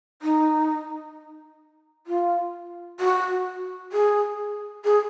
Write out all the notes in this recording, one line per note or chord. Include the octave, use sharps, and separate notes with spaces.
D#4
F4
F#4
G#4
G#4